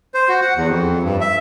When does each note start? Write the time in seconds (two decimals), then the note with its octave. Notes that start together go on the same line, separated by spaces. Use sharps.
0.14 C5
0.29 F#4
0.41 F#5
0.56 E2
0.68 F2
1.03 G2
1.21 E5